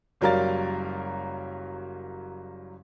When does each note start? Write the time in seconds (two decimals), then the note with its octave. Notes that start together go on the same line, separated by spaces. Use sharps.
0.21 F#1 F#3 G3 A#4 F5 A6